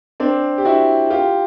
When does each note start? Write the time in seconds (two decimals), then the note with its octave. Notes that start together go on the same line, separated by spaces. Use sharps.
0.20 C4 D4
0.58 G4
0.65 E4 F#4
1.10 F4 G4